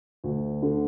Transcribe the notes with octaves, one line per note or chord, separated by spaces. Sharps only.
D2
D3